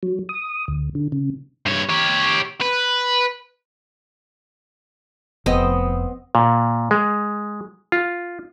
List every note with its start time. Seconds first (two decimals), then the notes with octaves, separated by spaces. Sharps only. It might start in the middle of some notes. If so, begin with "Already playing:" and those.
0.03 F#3
0.29 D#6
0.68 D2
0.95 D3
1.12 C#3
1.66 G2 C#5
1.90 G4 C#5
2.62 B4
5.46 F1 B3 C4 D#5
6.35 A#2
6.91 G#3
7.92 F4